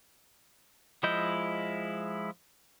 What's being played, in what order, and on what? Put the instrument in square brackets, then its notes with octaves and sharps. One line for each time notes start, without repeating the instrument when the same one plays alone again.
[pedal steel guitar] F3 G#3 E4 D#5 G6